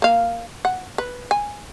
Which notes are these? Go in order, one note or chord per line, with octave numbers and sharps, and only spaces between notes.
A#3 F5
F#5
B4
G#5